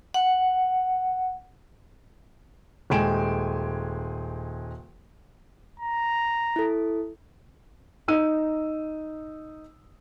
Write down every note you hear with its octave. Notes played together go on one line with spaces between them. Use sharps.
F#5
D#1 G#3 G5 G#5 D7 E7
A#5
E4 A4
D#4 E6 D#7